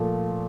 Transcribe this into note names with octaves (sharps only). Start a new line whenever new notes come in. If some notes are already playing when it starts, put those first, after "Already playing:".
Already playing: A#2 F3 A3